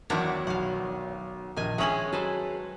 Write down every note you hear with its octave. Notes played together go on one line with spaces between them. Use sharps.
E2 D#3 F#3 D4 E4 A#5
B1 F5 F#5
A#1 D#3 D#5 G#5
G#3 C#4 G#4 E5 C#6 F#7
F#3 A4 B4 C5